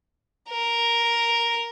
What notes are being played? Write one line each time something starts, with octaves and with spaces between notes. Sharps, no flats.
A#4